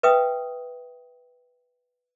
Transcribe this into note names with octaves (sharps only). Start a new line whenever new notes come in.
B4 E5 F5 G5 D#6